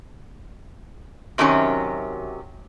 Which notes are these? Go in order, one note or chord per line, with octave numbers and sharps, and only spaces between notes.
F#2 C3 D#3 F#3 C#4